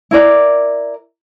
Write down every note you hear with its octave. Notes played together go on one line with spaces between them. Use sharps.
E4 A#4 D5